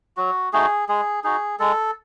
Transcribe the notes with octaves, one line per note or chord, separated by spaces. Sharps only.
F#3 F#4
A3 D#4 F#4 G#4
G#3 G#4
D#4 F#4 G#4
G#3 A4